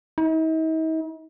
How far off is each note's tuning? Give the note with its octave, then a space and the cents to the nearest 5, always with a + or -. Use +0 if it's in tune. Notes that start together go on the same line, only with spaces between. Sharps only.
D#4 +45